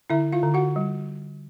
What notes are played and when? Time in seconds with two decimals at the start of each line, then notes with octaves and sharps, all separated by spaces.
0.10 D3 E4 E5
0.32 F4 F5
0.43 D3
0.54 F#4 F#5
0.76 G3